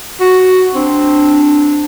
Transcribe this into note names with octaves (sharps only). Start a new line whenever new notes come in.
F#4
C4 D4